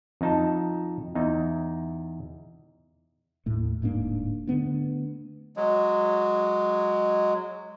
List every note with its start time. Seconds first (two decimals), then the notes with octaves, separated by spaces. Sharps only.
0.21 F2 D#4 A5
1.15 E2 D#4
3.46 D#2 A2 A3
3.82 D1 G#2 A#3 D4
4.47 D3 A3 B3 D4
5.57 F#3 G#3